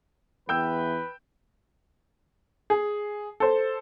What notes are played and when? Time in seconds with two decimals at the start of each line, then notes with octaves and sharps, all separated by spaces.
0.49 E2 B4 G5 E6 G6
2.70 G#4
3.40 A4 C5